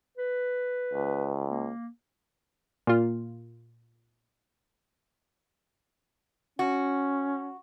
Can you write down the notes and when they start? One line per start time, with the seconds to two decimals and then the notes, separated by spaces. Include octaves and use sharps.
0.18 B4
0.93 C#2
1.48 A#3
2.87 A#2 F4
6.59 C#4 F#4